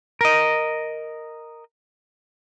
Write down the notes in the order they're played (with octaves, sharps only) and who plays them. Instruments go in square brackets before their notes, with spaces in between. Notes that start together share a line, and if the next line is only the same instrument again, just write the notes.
[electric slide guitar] A#4 D#5